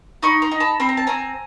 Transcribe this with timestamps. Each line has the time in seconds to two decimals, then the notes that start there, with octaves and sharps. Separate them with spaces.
0.23 D#4 B5 C#6
0.42 A#5 C6
0.52 D#4
0.60 A5 B5
0.80 C4 B5
0.89 A#5
0.97 A5
1.07 C4 G#5 A#5